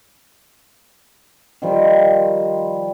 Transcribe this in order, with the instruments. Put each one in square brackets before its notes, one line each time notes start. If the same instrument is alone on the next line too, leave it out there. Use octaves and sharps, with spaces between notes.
[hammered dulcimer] D#3 F3 G3